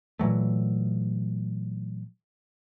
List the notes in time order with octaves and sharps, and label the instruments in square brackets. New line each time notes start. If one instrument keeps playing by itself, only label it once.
[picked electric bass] A#2 E3 F#3 A3